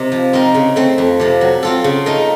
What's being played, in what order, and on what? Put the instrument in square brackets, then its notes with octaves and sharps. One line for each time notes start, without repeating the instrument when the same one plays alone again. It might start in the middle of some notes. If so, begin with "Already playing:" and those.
Already playing: [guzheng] C3 D#4 A#4
F3
C4 D#4 A#4
C#3
A3 C4
F2
C3 F3
F#3
C4 F4 A4
C#3
A3 D#4 A#4